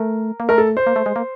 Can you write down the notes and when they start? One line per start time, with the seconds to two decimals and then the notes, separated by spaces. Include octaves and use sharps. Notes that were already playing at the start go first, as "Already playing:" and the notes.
Already playing: A3 A#4
0.40 A#3
0.49 A3 A#4
0.58 A4
0.77 C5
0.87 A#3
0.96 A3
1.06 G#3
1.16 A#3